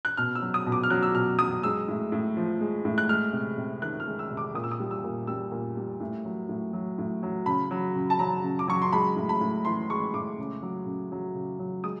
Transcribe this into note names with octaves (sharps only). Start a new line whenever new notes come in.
F#6
B2 F6
E6
F#3
D#6
B2
D6
F6
F#3 F#6
E6
B2 F6
F#3 D#6
G#3 E6
A2
A2
F3
G#3
A2
F#6
G#3 F6
C3
C3
D#3 F#6
F6
G#3
E6
C3
D6
A#2 D#6
E6
D#6
G3
E6
A#2
G3 E6
A#2
G3
A2
F#3
A2
F#3
A2
F#3
C#3 B5
F#3
C#3
A5
F#3 A#5
C#3
D6
F#3 C#6
C6
G#3 B5
A2
B5
A2
E3 C6
G#3 C#6
A2 D6
C#3
F#3
C#3
F#3
C#3
F#3
G#3 D#6